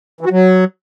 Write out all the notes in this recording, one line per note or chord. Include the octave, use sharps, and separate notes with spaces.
E3
F#4
F#3